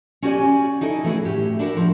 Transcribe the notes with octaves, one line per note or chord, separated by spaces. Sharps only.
C#4 F#4 G4 C#5 D5 G#5
D#4 E4 A4 D#5
E3 G3 A3 E4 F#4 G#4
A2 G4 E5
D4 E4 F#4 A4 A#4
F3